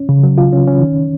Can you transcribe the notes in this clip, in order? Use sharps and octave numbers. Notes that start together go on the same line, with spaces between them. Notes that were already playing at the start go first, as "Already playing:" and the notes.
Already playing: C#4
C#3
F#3
F4
C#4
C#4
D#3